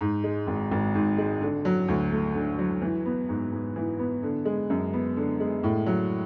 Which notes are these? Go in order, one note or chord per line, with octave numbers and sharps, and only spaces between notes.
G#2
G#3
G#1
G#1
G#2
G#3
D3
F#3
D2
A3
D3
F#3
E3
B3
G#2
G#2
E3
B3
D3
G#3
F#2
B3
D3
G#3
A2
F#3